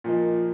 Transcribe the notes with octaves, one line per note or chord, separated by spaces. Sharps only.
A#2 F3 A#3 D#4